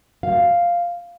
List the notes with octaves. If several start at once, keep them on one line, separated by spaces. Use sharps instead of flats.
F5